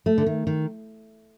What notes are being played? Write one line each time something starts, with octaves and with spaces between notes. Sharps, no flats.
A3
D3
D#3
D#3